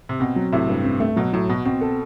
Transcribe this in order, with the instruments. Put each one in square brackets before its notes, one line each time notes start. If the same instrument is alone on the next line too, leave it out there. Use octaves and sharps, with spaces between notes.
[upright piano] C3
[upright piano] B2 [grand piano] C4
[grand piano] F#3
[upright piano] A2 C3 [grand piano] E4
[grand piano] G2
C4
A3
[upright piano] B2 [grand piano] F#3
[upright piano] A2 [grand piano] F#3
[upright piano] B2 [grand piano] F#4
[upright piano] B2 [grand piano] C4
[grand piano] A4